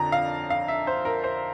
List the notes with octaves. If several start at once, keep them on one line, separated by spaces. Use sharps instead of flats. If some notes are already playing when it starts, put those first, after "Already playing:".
Already playing: F2 D3 A#5
F5
F5
E5
C5
A#4
C5